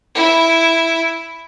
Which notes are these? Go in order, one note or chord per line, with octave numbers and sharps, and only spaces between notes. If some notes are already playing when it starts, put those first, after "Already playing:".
E4